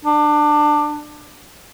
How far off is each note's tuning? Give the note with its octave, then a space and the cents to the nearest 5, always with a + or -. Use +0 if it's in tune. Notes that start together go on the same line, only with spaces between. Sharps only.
D4 +20